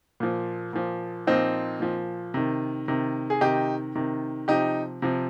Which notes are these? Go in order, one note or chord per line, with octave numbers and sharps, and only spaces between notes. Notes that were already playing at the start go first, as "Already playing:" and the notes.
A#2 F3
A#2 F3
A#2 F3 C4 D#4
A#2 F3
C3 D#3
C3 D#3
G#4
C3 D#3 D#4 G4
C3 D#3
C3 F3 D#4 G4
C3 F3